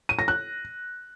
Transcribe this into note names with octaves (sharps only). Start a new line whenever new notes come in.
D#7
A#6
F#6